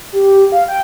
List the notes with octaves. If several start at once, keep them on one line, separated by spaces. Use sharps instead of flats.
G4
F5
G5